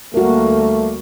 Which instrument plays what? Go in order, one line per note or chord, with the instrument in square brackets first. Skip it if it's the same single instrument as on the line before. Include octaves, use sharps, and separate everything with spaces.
[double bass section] D2 G3 A#3 [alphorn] A3 [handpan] F#4 A#4